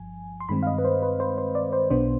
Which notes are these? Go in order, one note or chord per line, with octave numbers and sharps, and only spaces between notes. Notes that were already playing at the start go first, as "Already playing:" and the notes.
Already playing: G1 G2 F3 G#5
C6
G2 D#3 G#3 C4 B5
F5
D#5
B4
C5
B4
C5
C5
D5
C5
B1 B2 B3 D4 C5